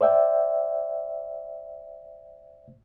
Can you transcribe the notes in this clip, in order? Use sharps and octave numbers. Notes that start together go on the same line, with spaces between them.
C5 D5 E5 G5